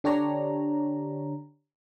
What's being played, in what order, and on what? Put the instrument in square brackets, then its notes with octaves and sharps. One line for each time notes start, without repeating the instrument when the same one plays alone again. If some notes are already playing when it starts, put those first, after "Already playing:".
[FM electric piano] D3 D4 G4 C#5 A#5